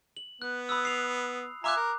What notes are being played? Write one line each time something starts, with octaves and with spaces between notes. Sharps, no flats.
F#7
B3 F#6
B5 D#6 E6
C7 F7
F4 E5 G#5 A#5 D6 F#6
A#4